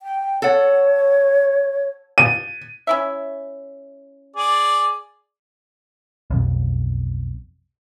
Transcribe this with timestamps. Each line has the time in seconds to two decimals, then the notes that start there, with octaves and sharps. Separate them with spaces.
0.02 G5
0.42 A4 C#5 F#5
2.18 D#7
2.87 C#4 E4 E5
4.36 G#4 D5
6.30 B1 F2